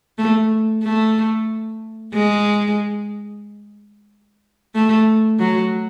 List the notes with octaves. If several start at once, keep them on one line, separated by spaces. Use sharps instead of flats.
A3
A3
G#3
A3
F#3